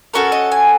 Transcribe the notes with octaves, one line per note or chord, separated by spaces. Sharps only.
C#4 F#4 A4 A#4
D#5
G#5